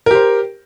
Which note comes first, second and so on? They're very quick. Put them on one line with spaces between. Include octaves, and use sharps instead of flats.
A#4 G4 C5